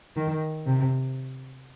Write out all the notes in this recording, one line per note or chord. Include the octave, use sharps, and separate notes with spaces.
D#3
C3